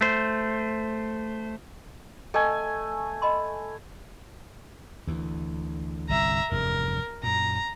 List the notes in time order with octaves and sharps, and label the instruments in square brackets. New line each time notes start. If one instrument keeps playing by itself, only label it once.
[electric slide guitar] A3 C5
[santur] A3 G#5 [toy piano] A4 D#5 G5
[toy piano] D#5 B5 C6
[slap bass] D2 E3
[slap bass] G1 C2 [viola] E5 A#5
[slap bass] F1 E2 G2 [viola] A#4
[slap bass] F#2 A#2 [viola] A#5